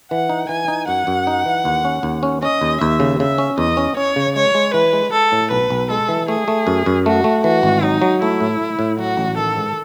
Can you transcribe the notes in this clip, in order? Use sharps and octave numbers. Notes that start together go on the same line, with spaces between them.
E3 F#5
D#4
E3 G#5
D#4
F#2 F#5
F#2
D#4
E3
D#2
C#4
D#2
C#4
C#4 D#5
D#2
D#2 E5
C#3
C#3 E5
C#4
E2 D#5
C#4
C#4 C#5
C#3
G#3 C#5
G#3
E3 B4
G#3
G#3 A4
A2
B1 B4
B1
G#3 A4
E3
A3 G#4
A3
F#2
F#2
A3 F#4
A3
E3 F#4
G#1
F#3 D#4
F#3
A3 E4
A2
A2
A2
F#3 F#4
A1
D#3 A4
G#2